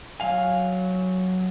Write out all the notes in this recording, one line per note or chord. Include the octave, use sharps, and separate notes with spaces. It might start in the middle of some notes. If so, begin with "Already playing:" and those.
F#3 F5 G#5